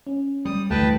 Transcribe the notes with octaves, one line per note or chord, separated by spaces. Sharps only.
C#4
G3 D#6
D2 G2 E3 A3 B4 G5 A5